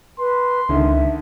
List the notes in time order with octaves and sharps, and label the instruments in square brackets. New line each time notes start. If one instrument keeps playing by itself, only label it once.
[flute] B4 [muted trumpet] C6
[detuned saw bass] C#2 [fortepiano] D3 D#3 [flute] E5